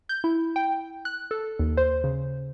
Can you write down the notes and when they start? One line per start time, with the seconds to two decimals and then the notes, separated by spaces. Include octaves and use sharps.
0.09 G6
0.24 E4
0.56 G5
1.05 F#6
1.31 A4
1.59 D#2
1.77 C5
2.04 C#3